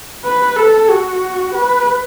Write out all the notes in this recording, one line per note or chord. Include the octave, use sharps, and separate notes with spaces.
B4
A4
F#4
B4